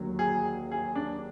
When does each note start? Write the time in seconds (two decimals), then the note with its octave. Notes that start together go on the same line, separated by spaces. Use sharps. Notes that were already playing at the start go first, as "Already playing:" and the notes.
Already playing: D#2 D3 F#3
0.19 G#4
0.72 G#4
0.95 D4